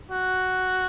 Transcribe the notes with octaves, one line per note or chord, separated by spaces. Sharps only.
F#4